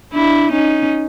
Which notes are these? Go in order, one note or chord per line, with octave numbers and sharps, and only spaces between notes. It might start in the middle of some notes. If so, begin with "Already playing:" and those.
D4 E4
C#4 D#4